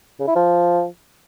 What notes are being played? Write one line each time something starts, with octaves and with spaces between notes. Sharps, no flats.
C#3
E4
F3